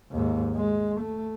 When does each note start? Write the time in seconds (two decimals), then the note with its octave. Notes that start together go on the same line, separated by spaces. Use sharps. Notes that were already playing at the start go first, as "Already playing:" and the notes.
0.12 D#2 G#2
0.56 G#3
1.01 A3